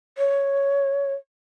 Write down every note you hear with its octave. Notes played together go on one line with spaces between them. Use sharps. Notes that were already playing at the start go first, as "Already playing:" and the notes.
C#5